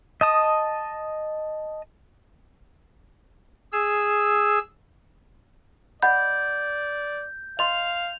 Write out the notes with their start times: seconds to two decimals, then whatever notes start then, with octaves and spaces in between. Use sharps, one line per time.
0.21 D#5 A5 D#6
3.72 G#4 E6
6.03 D5 D#5 F#5 B5 G6
7.59 D#5 F5 C6 F7